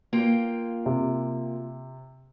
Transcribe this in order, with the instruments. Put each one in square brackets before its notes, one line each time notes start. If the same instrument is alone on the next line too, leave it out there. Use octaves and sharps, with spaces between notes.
[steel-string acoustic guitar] A#3 F4 G5
[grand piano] C3